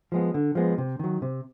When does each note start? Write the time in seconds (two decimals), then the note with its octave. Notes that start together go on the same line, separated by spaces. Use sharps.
0.12 F3 G#3 B3
0.34 D3
0.55 F3 G#3 B3
0.78 C3
0.99 D#3 F#3
1.22 C3